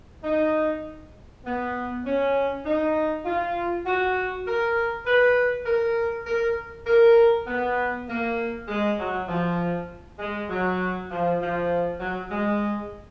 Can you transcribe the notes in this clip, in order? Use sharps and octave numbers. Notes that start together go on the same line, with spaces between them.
D#4
B3
C#4
D#4
F4
F#4
A#4
B4
A#4
A#4
A#4
B3
A#3
G#3
F#3
F3
G#3
F#3
F3
F3
F#3
G#3